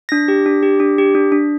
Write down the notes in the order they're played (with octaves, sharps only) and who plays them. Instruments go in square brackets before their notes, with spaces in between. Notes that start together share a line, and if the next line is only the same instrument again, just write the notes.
[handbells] D4 A#6
G4
D4
G4
D4
G4
D4
D4